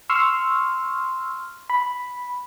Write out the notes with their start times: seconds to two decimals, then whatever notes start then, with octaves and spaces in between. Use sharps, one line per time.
0.10 C6 C#6 E6 F6
1.70 B5